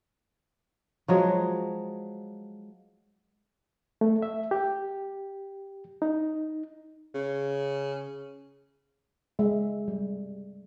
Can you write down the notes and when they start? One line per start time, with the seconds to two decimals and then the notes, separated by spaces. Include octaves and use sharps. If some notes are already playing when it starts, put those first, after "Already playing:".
1.08 F3 F#3 G#3
4.01 A3
4.22 E5
4.51 G4
6.02 D#4
7.15 C#3
9.39 G#3 E5
9.88 G3